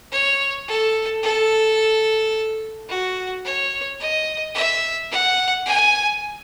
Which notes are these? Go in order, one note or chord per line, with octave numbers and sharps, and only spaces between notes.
C#5
A4
A4
F#4
C#5
D#5
E5
F#5
G#5